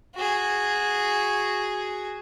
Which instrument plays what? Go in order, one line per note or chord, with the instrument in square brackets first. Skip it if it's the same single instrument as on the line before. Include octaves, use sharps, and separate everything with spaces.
[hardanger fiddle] F#4 G#4